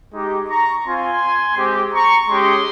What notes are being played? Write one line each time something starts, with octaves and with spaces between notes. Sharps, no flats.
G#3 D#4 G4
A#5 C#6
C4 F4 G#5 C6
G#3 C4 G4
A#5 C#6
G#3 C#4 G4 C6 D#6